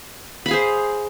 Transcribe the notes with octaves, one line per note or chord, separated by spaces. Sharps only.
G#4 C5 F5 B5